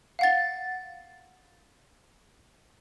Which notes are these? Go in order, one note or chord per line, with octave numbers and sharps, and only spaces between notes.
F5 F#5 A6